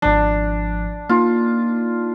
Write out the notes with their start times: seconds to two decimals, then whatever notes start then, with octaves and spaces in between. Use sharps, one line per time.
0.02 G#1 F3 D4
1.09 A#3 D#4 F4